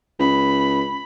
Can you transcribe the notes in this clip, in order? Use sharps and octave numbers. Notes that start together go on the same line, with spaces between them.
C#2 B5